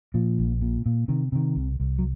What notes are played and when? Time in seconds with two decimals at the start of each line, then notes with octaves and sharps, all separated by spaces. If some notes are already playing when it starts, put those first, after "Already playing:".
0.14 A#2 F3
0.39 A#1
0.61 A#2
0.86 A#2
1.08 C3 D#3
1.32 C3 D#3
1.56 C2
1.80 C2
1.99 F#3